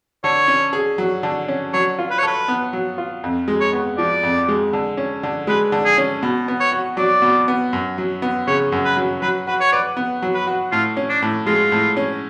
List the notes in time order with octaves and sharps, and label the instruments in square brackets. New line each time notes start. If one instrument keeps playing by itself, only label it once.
[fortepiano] D3 [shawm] C#5
[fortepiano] C#4
G#4
F#3
D3
C#4
[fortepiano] F#3 [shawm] C#5
[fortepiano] F4
[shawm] B4
C#5
[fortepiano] A4 [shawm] B4
[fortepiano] B3
F#3
F4
F2
G#3
[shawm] C#5
[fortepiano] B3
[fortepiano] F3 [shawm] D5
[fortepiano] F2
G#3
D3
C#4
D3
[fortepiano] G#3 [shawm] B4
[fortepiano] D3
[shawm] G#4
[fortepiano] C#4
B2
B3
[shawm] C#5
[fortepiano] F#4
[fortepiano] F#3 [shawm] D5
[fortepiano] B2
B3
F#2
F#3
B3
[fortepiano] C#3 [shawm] C#5
[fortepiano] F#2
[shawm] B4
[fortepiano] F#3
[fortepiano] F#3 [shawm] B4
[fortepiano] F#4 [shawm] B4
[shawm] C#5
[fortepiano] B4 [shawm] D5
[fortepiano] B3
F#3
[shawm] B4
[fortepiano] F#4
[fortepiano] A2 [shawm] F4
[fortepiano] C#4
[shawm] D4
[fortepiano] A2
[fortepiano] G#3 [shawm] F4
[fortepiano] A2
C#4